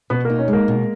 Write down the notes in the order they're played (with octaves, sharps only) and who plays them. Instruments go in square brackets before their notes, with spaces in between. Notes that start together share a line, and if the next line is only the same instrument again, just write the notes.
[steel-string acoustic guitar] B2 [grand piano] B3 B4
[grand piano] A#3 A#4 [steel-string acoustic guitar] D#4
[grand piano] C#4 C#5
[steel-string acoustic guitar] G#3
[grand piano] A#3 A#4
[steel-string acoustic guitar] B2